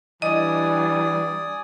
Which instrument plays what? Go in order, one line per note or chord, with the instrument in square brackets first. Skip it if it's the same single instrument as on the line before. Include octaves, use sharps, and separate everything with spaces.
[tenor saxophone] E3 [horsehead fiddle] G3 D4 [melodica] D5 G#5 D#6 [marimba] D#5